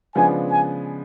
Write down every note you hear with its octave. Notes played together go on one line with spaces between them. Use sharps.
C#3 F3 G#3 B3 D4 G#5
G#5